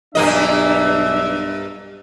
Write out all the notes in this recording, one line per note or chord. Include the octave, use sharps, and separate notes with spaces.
B1 G2 A#3 D4 D#5 E5